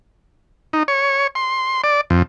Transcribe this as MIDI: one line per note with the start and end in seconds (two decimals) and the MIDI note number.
0.73 0.83 63
0.88 1.27 73
1.35 1.82 84
1.84 2.01 74
2.10 2.23 41